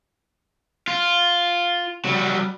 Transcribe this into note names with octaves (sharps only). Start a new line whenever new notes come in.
F4
F#3 G3